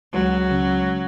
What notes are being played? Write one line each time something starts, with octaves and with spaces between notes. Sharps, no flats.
C#2 F#3
C#3